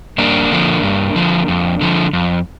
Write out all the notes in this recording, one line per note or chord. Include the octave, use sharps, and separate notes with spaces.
G2 A#3 D4
D3 F3
G2
D3 F3
F2
D3 F3
F2